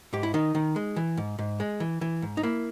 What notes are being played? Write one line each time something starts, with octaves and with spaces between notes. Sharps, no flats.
G#2 G4
E4
D#3 D#4
D#3
G#3
E3
G#2
G#2
G#3
E3
E3
G#2
D#4
A#3 E4